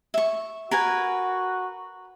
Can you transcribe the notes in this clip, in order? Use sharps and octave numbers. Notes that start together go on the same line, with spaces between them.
E5 C#6
F#4 A#4 B4 G#5